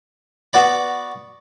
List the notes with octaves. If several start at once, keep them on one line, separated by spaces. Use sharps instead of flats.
B3 F#4 D5 B5